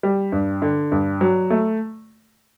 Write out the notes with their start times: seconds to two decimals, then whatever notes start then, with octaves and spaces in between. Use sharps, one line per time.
0.03 G3
0.32 G2
0.62 D3
0.92 G2
1.21 F#3
1.50 A3